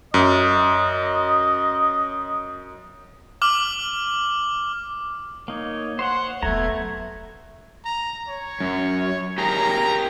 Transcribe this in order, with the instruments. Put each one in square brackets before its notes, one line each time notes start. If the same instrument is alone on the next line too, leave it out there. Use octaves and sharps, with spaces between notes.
[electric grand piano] F#2 [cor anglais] D#5
[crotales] D6 F6 F#7
[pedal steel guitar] A#3 D#4 [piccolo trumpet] C#5
[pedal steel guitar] C5 C#5 C6 [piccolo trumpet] F#5
[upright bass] E1 F#3 [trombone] A3 [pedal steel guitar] B3 A#5 [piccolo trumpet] G#6
[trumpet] A#5
C#5
[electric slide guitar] F#2
[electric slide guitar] G4 G#4 A#4 [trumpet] A#5